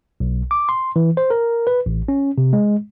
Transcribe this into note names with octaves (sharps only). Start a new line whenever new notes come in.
B1
D6
C6
E3
C5
A#4
B4
A1
C#4
C3
G#3